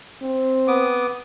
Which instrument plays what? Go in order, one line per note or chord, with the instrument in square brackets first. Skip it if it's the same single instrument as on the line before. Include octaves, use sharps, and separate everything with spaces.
[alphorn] C4
[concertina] B3 D6 D#6